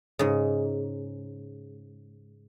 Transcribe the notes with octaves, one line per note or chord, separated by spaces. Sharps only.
G#2 C#3